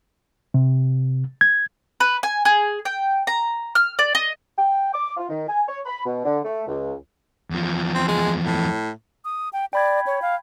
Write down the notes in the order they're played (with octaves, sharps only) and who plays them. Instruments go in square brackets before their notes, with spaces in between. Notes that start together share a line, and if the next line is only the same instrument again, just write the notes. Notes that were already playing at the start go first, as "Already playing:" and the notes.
[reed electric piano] C3
G#6
[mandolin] B4
G#5
G#4
G5
A#5
F6
D5
D#5
[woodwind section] G5
D6
F4
D#3
G#5
C#5
B5
B2
D3
A3
C#2
[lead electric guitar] E2 F3
[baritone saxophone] C4
G#3
A2
[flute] D#6
G5
[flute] D5 [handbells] G5 B5 G#6
[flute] C#5
F5